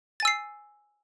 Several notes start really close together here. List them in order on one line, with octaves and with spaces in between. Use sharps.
A6 G#5 E6 C7